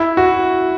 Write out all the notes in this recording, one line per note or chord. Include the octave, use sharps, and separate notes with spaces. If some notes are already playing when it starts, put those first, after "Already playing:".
Already playing: E4
F#4